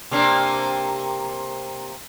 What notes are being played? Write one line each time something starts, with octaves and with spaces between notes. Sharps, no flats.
C3 A#3 D4